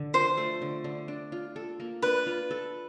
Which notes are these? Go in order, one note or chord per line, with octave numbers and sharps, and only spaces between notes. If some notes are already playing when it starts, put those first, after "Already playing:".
Already playing: D3
F3 C5
A3
D3
D3
D4
F4
A4
A#3
D4 B4
F4
A4